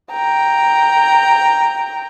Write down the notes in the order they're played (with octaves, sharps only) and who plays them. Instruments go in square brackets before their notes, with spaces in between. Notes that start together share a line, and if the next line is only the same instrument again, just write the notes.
[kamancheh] G5 A#5